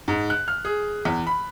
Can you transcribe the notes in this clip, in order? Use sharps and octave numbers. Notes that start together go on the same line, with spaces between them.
G#2
F#6
F6
G#4
E2
B5